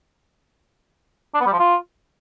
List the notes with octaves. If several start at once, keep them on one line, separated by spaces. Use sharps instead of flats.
D4
B3
G3
F3
F4